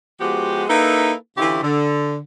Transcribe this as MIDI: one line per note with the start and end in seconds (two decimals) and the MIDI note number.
0.20 0.65 53
0.20 0.65 56
0.20 0.65 59
0.20 0.65 66
0.20 0.65 67
0.69 1.13 58
0.69 1.13 63
0.69 1.13 64
0.69 1.13 69
0.69 1.13 71
1.37 1.61 50
1.37 1.61 52
1.37 1.61 61
1.37 1.61 64
1.37 1.61 65
1.37 1.61 67
1.63 2.18 50